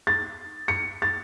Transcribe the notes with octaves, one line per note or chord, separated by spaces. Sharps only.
A6
C#7
A6